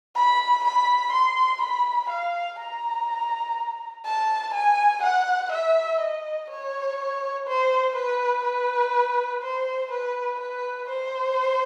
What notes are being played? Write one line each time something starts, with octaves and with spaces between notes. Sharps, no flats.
B5
B5
C6
B5
F5
A#5
A5
G#5
F#5
E5
D#5
C#5
C5
B4
B4
C5
B4
B4
C5